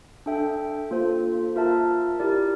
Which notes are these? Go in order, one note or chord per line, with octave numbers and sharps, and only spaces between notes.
D4 A4 E5 G5
A#3 F4 A4 C5
F4 A#4 E5 A5
E4 G4 A#4 D5